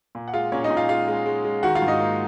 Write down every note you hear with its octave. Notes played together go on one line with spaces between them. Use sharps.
A#2
F#5
G#3 F4 F5
A#2 C#4 C#5
D#4 D#5
A#2
F4 F5
G#3 F4 F5
G#3
G#3
G#3
D#3 F#4 F#5
F4 F5
G#2
D#4 D#5
A#3